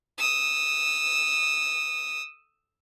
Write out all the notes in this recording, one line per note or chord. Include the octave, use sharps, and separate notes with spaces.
D#6 E6